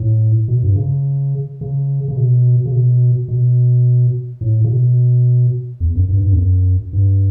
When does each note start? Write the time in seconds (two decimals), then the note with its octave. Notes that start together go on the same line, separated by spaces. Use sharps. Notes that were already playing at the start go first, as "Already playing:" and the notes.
Already playing: A2
0.48 B2
0.63 G2
0.76 C#3
1.61 C#3
2.08 C#3
2.17 B2
2.66 C#3
2.72 B2
3.28 B2
4.41 A2
4.64 C#3
4.68 B2
5.80 E2
5.95 F#2
6.08 G2
6.23 G2
6.33 E2
6.37 F#2
6.93 G2